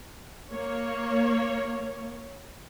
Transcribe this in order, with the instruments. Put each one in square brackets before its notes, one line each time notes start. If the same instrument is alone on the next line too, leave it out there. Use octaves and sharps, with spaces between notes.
[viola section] A#3 C#5